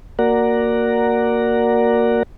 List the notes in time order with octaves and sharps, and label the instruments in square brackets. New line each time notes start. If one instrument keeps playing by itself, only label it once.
[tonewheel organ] A#3 F#4 A#4 D5 F#5 A#5